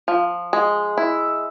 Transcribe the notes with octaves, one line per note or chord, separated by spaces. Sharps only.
F3
G#3
E4